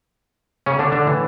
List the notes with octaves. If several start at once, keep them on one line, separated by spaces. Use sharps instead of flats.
C#3 C#4
D3 D4
D3 D4
A2 E3